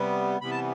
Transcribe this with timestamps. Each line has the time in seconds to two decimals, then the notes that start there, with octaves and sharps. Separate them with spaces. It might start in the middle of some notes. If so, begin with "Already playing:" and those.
Already playing: C3 G3 B3
0.41 C3 E3 G3 B3 B5
0.51 A5